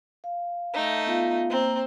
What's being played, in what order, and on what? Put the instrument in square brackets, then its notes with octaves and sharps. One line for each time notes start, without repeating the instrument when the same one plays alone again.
[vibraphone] F5
[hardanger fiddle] A3 D#4
[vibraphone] B3 F4 F5
[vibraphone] A#3 A#5 [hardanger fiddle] C4